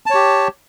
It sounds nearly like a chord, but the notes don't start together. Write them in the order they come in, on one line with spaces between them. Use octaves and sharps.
A5 C#5 G4